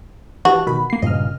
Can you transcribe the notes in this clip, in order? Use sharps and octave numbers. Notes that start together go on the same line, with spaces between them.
E3 F#4 G4 A5
B2 D#3 B5
A#3 C7
G2 A#2 C#3 D#5 F6